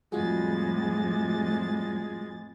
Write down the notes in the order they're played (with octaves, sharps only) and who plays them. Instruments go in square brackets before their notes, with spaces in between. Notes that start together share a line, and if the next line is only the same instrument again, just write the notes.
[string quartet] F2 A2 A6 [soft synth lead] G3 [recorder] G#3 [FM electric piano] F4 F#4 G#4